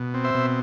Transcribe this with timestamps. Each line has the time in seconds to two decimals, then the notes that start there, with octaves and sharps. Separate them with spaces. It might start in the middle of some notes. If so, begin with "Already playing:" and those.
Already playing: B2
0.14 C4
0.24 C5 E5
0.34 B2